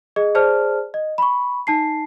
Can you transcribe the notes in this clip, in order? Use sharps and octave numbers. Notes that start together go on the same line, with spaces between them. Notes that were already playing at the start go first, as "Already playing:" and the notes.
G#4 D#5
G#4 C5 D5 A5 F6
D#5
B5 C#6
D#4 A5 C7